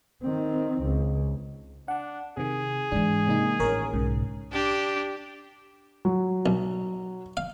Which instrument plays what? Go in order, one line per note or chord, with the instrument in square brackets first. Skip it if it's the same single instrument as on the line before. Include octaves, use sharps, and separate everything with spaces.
[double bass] D#3 C4
C#2
[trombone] D4 [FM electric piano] F#5
[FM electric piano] C3 D#3 [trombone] G#4
[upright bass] G#2 E3 [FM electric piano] D4
[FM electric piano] C3 A#3 D#4
[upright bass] A1 [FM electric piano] D#3 A#4 C#5
[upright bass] B1 [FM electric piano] G#2 C#3
[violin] D4 G4
[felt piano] F#3
[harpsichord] B1
F5